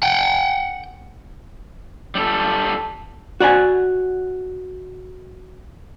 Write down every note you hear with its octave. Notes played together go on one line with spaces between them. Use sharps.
F#5 G5
G3 A4
F#4 D5 F#5 G#5